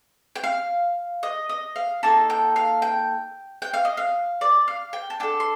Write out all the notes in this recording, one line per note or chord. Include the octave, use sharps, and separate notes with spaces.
G5
F5
D#5
D#5
F5
A#3 D#4 A4 A5
G5
F5
G5
G5
F5
D#5
F5
D5
F5
G5
A5
D4 A4 G5
C6